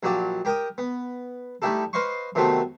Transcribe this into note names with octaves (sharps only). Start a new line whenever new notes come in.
A#1 F#3 F#4 G4 D5
G4 A#4 G5 D#6
B3
G3 A3 D#4 E4 G4 A4
B4 C5 D#5 F5 C6 C#6
C3 D#3 F#3 A3 B3 C4